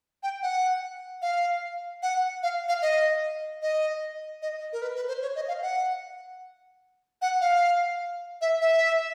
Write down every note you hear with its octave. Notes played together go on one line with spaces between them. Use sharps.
G5
F#5
F5
F#5
F5
F5
D#5
D#5
D#5
A#4
B4
B4
C5
C#5
D#5
F5
F#5
F#5
F5
E5
E5